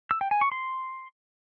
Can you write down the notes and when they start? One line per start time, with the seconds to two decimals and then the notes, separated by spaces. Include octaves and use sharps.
0.11 E6
0.21 G5
0.31 G#5
0.41 C#6
0.52 C6